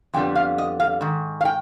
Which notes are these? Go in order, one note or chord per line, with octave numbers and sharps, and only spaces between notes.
F2 D3 G3 B3 G5
F5
D#5
F5
G#2 D#3
F5
G5